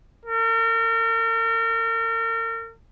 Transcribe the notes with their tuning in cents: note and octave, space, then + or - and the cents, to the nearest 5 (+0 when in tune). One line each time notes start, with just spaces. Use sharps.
A#4 -40